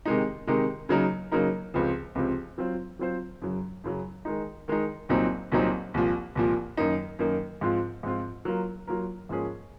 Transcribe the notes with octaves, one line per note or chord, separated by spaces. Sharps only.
C3 D#3 G#3 D#4
C3 D#3 G#3 D#4
C#3 F#3 A#3 D#4 A#4
C#3 F#3 A#3 D#4 A#4
C#2 C3 F3 C4
C#2 C3 F3 C4
F#3 C4 F4 C5
F#3 C4 F4 C5
F#2 C#3 F#3
F#2 C#3 F#3
D#3 G#3 D#4
D#3 G#3 D#4
C2 A#2 F#3 C4 D#4
C2 A#2 F#3 C4 D#4
C2 A#2 F3
C2 A#2 F3
F#2 D#3 A#3 D#4
F#2 D#3 A#3 D#4
G#2 F3 C4 F4
G#2 F3 C4 F4
F#3 A#3 F4 A#4
F#3 A#3 F4 A#4
G#2 F3 A#3 C#4 G#4